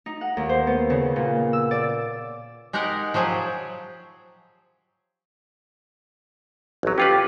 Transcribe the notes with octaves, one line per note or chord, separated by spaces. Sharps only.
D#4
F#5
D#2
C5
B3
C#3
A#2
E6
D5
G#3 D#4 G4 A#4 F#5
F3 F#3 G4 G#4
A1 F#3
C#4 F4 G4 B4